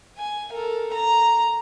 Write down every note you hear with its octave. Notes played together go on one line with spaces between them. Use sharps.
G#5
A4 A#4
A#5